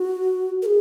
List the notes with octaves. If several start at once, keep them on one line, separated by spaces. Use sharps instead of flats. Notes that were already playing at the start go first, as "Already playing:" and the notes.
Already playing: F#4
A#4
G#4